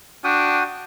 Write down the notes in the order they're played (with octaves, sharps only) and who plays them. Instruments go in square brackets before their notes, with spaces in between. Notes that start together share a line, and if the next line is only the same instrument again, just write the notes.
[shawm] D4 [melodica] F#4 G5 D#6